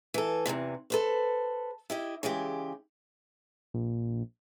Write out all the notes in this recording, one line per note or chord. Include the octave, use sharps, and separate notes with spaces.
E3 A4
E2 G#2 C3 E3
A4 B4 C5
E4 G4 D#5
C#3 E3 G#3 G4
A#1